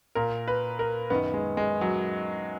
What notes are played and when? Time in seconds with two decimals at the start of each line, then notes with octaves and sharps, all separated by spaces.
0.15 A#2 A#4
0.48 B4
0.79 A#4
1.10 F#2 D#3 B3
1.34 G#3
1.57 G#3
1.81 F#3